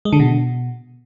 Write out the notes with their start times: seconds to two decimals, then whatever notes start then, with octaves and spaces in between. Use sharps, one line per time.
0.05 G#3
0.12 D3
0.20 B2